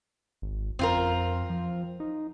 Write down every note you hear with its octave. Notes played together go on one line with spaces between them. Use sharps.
G#1
F2 C4 F4 A#4
F3
D#4